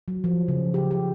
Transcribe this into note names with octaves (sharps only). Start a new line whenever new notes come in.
F#3
F3
C#3
G4
G4